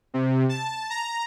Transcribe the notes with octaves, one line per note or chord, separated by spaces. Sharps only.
C3
A5
A#5